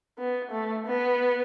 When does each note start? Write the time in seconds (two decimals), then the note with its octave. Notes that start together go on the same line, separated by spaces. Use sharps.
0.18 B3
0.52 A3
0.87 B3